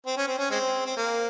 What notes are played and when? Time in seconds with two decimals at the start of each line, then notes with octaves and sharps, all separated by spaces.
0.06 C4
0.17 C#4
0.28 C4
0.39 C#4
0.51 G#3 C4
0.86 C4
0.97 A#3